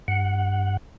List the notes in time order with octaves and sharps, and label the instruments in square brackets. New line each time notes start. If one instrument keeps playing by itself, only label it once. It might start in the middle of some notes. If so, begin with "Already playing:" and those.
[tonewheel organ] G2 F#5